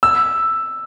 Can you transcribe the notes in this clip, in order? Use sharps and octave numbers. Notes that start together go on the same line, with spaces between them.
E6